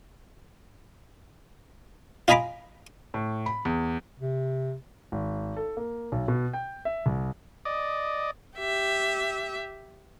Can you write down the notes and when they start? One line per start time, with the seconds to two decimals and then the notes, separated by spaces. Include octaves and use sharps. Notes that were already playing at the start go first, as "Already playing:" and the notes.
2.28 F4 D#5 G#5 A#5 B5 D6
3.14 A2
3.46 B5
3.65 E2
4.19 C3
5.12 G#1
5.57 A4
5.77 A#3
6.12 B1
6.28 B2
6.53 G5
6.85 E5
7.06 C2
7.65 D5 D#5
8.58 G4 E5